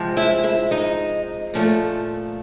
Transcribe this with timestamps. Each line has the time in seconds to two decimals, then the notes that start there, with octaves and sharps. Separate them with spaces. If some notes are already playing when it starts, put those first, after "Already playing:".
Already playing: C3 F3 G#3
0.17 E4 E5
0.44 E4 E5
0.71 D#4 D#5
1.54 A#2 F3 A3